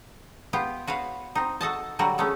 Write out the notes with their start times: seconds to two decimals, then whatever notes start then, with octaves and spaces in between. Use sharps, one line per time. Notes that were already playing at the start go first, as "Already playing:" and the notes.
0.53 B3 F4 G4
0.87 F#4 B4 C#5 F5
1.35 C4 D#4
1.61 F#4 A4 D#5 A5
1.99 D3 F#3 G3 F#4 A#4
2.18 G#3 A3 B3 C#4